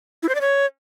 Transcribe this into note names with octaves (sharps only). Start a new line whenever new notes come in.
E4
C5
D5
C#5